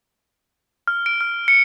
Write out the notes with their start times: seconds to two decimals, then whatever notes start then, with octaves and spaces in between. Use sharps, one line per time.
0.87 F6
1.06 D7
1.21 F6
1.48 C#7